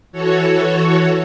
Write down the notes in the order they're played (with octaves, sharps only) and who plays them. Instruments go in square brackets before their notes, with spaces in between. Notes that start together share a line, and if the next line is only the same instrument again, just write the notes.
[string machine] E3 F#4 A4 C#5